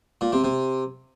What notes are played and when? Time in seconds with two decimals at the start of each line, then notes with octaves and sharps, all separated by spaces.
0.21 A#2
0.32 C3
0.44 C3